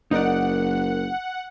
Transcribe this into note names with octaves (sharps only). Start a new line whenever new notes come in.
F#1 D#4 A#4 D5 F#5